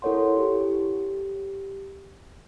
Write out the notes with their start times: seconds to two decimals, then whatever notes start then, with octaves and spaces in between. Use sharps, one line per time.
0.02 E4 A4 A#4 C#5 F#5 C6
0.37 G4